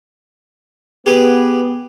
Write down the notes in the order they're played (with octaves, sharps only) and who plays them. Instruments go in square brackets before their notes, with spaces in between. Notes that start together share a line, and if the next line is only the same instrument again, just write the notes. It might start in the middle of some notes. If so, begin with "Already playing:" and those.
[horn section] B3 [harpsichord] G4 G#4 B4